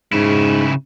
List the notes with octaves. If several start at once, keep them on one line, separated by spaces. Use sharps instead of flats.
G#2 C#3 E4